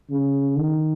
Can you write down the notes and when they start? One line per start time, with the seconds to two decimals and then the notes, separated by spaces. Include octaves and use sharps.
0.10 C#3
0.57 D#3